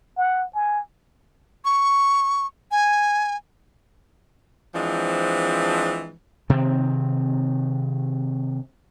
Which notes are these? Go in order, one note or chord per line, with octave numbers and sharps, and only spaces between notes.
F#5
G#5
C#6
G#5
E3 F3 G#3 C4 D4
C3 D#3 C4